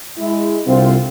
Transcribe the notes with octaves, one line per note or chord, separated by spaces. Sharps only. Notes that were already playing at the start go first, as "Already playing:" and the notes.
G#3 E4
C2 D3 C4 F4